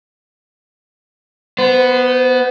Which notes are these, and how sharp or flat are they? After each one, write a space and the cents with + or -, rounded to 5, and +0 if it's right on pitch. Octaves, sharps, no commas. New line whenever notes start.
B3 +0 C5 -35